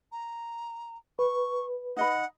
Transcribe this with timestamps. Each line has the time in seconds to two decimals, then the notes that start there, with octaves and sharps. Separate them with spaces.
0.12 A#5
1.19 B4 C#6
1.97 D#4 D#5 F#5 B5